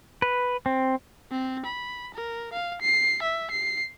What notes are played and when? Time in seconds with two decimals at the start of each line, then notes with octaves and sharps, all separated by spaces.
0.22 B4
0.66 C4
1.31 C4
1.65 B5
2.14 A#4
2.53 F5
2.81 C7
3.22 E5
3.51 C7